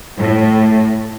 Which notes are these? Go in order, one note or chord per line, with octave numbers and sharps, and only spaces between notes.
A2